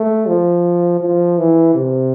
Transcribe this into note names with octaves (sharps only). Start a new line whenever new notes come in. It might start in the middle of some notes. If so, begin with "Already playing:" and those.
Already playing: A3
F3
F3
E3
C3